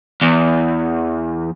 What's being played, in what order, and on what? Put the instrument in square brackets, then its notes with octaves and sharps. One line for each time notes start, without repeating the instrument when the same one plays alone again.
[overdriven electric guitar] E2